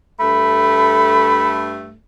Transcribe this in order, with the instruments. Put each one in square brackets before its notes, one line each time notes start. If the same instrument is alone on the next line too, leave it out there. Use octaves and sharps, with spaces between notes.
[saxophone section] G2 A3 [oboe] B5